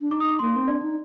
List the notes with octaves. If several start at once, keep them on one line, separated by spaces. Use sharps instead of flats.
D4
D#4 D6
D#6
D6
A#3 C6
C4
D4 D5
D#4